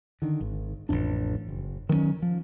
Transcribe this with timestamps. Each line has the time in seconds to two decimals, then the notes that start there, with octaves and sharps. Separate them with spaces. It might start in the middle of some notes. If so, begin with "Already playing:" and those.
0.22 D3 D#3
0.41 G#1
0.89 A1 F2 A2 D4
1.49 F#1
1.89 D#3 F#3 A3 C#4
2.22 F3